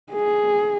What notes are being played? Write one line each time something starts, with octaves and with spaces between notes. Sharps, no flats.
G#4